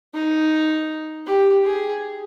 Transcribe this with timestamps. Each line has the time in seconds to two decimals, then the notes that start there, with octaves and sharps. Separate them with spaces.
0.14 D#4
1.26 G4
1.65 G#4